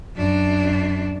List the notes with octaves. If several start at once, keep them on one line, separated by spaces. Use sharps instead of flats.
F#2 D4